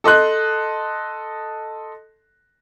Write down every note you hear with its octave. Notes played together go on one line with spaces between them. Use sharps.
A4 D#5 C6 F#6